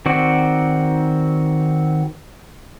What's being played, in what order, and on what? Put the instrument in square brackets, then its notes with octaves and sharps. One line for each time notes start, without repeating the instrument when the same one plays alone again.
[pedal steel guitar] D#3 C4 F#4 D5